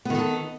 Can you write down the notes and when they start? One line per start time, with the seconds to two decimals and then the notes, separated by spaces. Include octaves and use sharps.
0.05 B3
0.10 D#3
0.15 A4